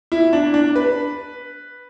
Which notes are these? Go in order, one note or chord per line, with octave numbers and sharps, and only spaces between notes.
E4
D4
D4
B4